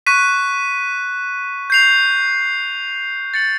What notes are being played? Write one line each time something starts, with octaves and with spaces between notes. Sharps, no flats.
C#6 F#6 B6 D#7
G6 C7 F7
A6 C#7 F#7